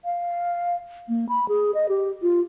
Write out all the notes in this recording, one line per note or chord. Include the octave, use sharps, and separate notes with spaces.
F5
A#3
B5
G#4
D#5
G4
F4